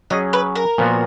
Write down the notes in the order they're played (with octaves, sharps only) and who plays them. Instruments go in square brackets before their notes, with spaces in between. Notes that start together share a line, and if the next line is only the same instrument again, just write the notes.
[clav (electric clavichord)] F#3 C#4 G#4 [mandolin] D#5
[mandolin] B4
A#4
[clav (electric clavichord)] A#2 F3 B3 F#4